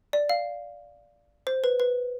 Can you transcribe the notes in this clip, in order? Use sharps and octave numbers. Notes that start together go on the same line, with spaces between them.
D5
F5
C5
B4
B4